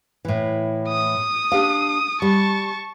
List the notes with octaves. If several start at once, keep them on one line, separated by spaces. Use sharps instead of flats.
A2 E3
D#6
D4 G4 F5
G3 A5 C#6